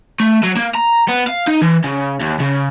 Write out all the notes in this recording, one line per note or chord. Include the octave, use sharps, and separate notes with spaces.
A3
F#3
A#3
A#5
B3
F5
D#4
E3
C#3
D#2
C#3